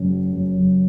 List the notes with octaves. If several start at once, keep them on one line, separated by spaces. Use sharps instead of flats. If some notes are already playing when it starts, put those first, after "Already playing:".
Already playing: F#1 F#2 C#4
F#3
F#2
F#1